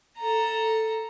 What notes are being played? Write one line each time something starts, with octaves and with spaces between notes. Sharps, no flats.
A4 A#5